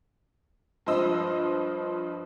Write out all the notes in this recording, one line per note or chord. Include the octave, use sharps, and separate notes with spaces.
G2 F3 C5 D#5 E6